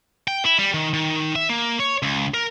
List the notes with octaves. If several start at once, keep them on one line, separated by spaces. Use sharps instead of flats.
G5
E4
G3
D#3
D#3
E5
A#3
C#5
C#2
A#4